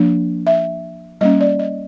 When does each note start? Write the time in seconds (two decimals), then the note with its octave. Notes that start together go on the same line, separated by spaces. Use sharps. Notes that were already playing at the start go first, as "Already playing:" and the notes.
Already playing: F3 A#3 D4
0.47 E5
1.21 G3 A#3 C#4 D#5
1.41 D5
1.59 D#5